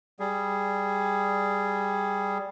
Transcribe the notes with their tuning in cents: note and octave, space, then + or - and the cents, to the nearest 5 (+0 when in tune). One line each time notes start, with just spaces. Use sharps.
G3 +0 G#4 +0